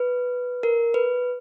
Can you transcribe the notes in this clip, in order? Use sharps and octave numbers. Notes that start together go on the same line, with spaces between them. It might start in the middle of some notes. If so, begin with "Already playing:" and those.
Already playing: B4
A#4
B4